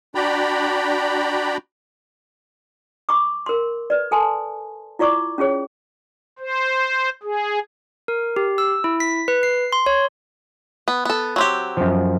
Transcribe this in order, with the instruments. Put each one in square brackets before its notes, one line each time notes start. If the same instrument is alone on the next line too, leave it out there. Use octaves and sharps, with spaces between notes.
[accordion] D4 F#4 D5 G5 A#5 B5
[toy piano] B5 C#6 D6
A#4 C6
B4 D5
A4 G#5 A5 C6
E4 F4 D5 C#6 D6
C#4 F4 G#4 C#5
[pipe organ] C5
G#4
[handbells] A#4
G4
E6
E4
B6
B4
C7
C6
C#5
[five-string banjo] B3
B3 A4
F#3 C4 G4
[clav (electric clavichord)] F#2 F3